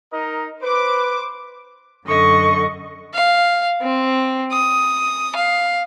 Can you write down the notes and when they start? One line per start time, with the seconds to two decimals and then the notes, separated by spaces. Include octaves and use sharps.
0.13 D#4 A#4 D#5
0.62 B4 C5 D6
2.06 F#2 D3 D#5 C#6
3.14 F5
3.81 C4
4.52 D#6
5.36 F5